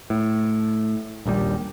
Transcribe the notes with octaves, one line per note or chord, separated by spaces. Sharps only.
A2
D#1 A#1 D#2 G3